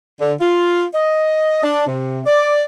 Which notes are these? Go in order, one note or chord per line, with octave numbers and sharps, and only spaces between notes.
D3
F4
D#5
D4
C3
D5